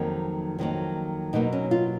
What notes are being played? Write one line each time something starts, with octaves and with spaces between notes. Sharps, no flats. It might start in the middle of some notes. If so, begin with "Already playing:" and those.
Already playing: F2 D#3 F#3 A#3
F2 D#3 F#3 A#3
B2 F#3 A#3 D#4
C#4
F4